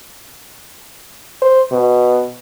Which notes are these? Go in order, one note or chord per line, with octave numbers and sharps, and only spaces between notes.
C5
B2